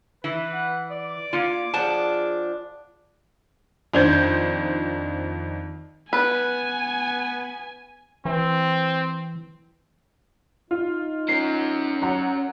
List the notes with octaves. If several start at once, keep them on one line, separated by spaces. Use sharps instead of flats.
E3 B4
F#5
D5 D6
A#3 F4
F3 D4 G#4 F#5 A5
F2 D#3 D4 C5 G6 G#6
B3 B4 G#5
E3 C4
D#4 F4
C#4 A#4 C7
F#3 F#5 A#5